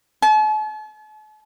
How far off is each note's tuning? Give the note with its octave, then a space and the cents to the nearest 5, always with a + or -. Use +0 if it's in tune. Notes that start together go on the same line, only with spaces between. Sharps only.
A5 -45